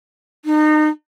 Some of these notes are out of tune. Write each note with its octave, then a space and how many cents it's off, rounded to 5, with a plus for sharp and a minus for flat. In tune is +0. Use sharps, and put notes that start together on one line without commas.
D#4 -30